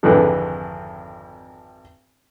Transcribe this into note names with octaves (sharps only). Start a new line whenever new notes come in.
G#1 F2 D3 E3